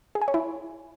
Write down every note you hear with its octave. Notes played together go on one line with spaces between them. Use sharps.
G#4
G#5
C#5
E4